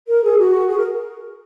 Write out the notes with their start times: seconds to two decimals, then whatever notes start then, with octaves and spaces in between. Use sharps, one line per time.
0.08 A#4
0.23 G#4
0.38 F#4
0.68 G#4
0.77 A#4